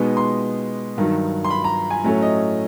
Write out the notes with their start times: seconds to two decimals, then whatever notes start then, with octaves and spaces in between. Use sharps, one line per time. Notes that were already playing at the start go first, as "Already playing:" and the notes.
Already playing: B2 G#3 B3 D#4
0.17 C6
0.97 G2 D#3 F#3
1.45 C6
1.50 B5
1.64 A#5
1.90 G#5
2.04 A2 F#3 A3 C#4
2.22 D#5